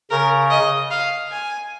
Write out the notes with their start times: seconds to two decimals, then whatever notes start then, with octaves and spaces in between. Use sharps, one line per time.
0.11 C#3 A#4
0.50 D#5
0.91 F5
1.31 G#5